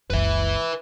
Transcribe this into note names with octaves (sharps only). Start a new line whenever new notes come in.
F#1 C#2 B4 E5